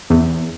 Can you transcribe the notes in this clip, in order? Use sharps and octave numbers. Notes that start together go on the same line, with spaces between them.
E2